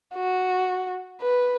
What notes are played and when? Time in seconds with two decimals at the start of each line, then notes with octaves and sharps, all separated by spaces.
0.15 F#4
1.21 B4